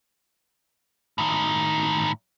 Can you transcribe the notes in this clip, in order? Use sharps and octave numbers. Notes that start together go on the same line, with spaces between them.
A2 D#3